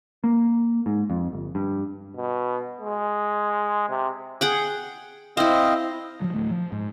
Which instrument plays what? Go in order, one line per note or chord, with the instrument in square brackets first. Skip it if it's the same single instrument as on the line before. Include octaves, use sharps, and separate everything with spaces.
[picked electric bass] A#3
G#2
F2
G1
G2
[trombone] B2
G#3
C3
[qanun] G#4 F#5 G5
[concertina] C4 D#5 F5 [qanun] E4 C5
[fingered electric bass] F3 F#3
D1 A3
F3
G#2